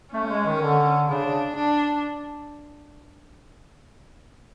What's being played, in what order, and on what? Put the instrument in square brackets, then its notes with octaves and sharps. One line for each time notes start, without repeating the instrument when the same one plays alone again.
[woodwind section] A3 [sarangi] C#4
[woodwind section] A3
G#3
D#3
D3
[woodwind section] C#3 [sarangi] D4
[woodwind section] C#3
[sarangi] D4